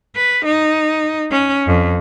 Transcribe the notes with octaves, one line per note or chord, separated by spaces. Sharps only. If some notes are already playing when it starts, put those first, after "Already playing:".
B4
D#4
C#4
F2